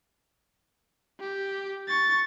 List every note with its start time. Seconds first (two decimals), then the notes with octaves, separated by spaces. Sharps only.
1.20 G4
1.88 C#6 A6